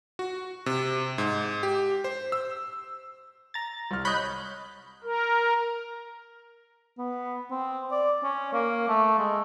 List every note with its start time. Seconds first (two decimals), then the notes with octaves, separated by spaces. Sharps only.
0.19 F#4
0.66 C3
1.18 G#2
1.63 G4
2.04 C5
2.32 E6
3.54 A#5 A6
3.91 C2 F6
4.05 C#5 D#5 B5 F#6 G6
5.04 A#4
6.98 B3
7.51 C4
7.91 D5
8.23 C#4
8.53 A#3
8.88 A3
9.19 G#3